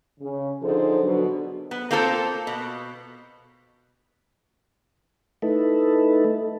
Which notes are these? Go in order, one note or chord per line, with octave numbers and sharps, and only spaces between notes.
C#3
D3 F3 D#4 G#4 A4 C5
B2 D3 F#3
B3
A#3 C4 F4 A4 B4 C5
B2
A3 D#4 E4 A4 B4